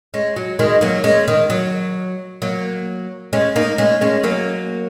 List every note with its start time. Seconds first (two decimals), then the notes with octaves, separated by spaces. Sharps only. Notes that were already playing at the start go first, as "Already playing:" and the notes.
0.14 G#3 C#4
0.36 F#3
0.59 D#3 G#3
0.81 F#3 A#3
1.04 G#3 C#4
1.28 D#3
1.50 F#3
2.42 F#3 A#3
3.33 G#3 C#4
3.56 A#3 D#4
3.78 G#3 C#4
4.01 G#3 C#4
4.23 F#3 A#3